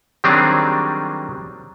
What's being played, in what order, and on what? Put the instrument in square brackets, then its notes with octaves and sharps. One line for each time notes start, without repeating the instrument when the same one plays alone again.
[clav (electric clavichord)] D#3 F#3 G3 C4 D4 G#4